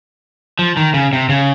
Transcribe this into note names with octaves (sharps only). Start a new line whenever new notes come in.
F3
D#3
C#3
C3
C#3